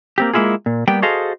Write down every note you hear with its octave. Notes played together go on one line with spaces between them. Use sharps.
A#3 C4 G4
G#3 A#3 D4 E4 F4 G#4
A#2
G3 A#3 B3 G4 G5
F#4 G#4 A4 C5 D#5 F5